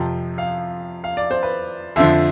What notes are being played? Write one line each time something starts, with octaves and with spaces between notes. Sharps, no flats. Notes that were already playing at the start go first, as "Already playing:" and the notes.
Already playing: F2 C3 F3 G5
F5
F5
D5
C5
B4
F2 D3 F3 E5